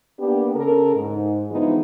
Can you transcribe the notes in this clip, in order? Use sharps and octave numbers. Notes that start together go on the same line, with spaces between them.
A#3 B3 D4 G4
C#3 A4 A#4
G#2
D3 E3 F3 G#3 B3 D#4